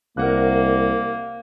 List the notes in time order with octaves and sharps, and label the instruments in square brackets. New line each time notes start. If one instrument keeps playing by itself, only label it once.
[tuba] C2 [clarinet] A#3 [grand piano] A#4 F#5 F#6